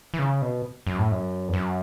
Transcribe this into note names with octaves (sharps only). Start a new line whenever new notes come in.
E3
C#3
B2
F#2
A2
F#2
E2
F#2